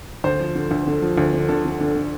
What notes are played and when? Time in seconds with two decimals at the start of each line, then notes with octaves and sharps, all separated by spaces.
0.24 D2 C5
0.40 F3
0.55 D3
0.71 D2
0.87 D3
1.02 F3
1.18 D2
1.33 D3
1.49 D3 A4
1.65 D3
1.80 D3
1.96 D3